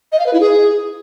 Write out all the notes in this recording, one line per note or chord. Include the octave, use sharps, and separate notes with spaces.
D#5
F5
B4
E4
G#4